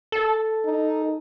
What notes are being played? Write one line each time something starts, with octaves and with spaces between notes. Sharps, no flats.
A4
D#4